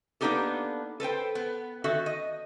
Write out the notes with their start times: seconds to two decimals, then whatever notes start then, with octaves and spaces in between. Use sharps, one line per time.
0.21 A#3 B3 D4 D#4 G4 A4
1.00 A4 B4 C5 G5
1.35 B3
1.84 D#3 F#4 A4 E5
2.06 D#5